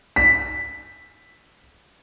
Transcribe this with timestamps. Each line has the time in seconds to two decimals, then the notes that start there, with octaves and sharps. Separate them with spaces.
0.16 B6